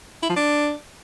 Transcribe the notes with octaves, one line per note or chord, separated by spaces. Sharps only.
E4
F3
D4